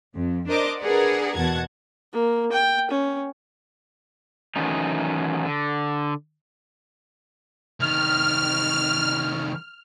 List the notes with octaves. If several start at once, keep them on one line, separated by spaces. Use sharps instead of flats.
F2
D4 A#4 C5 D#5 D6
D4 G#4 A#4 B4 D5 F#5
E2 B2 F#5 A5 G#6
A#3
G5
C#4
D#3 E3 F#3 A3 C#4 D#4
D3
C2 D#3 F6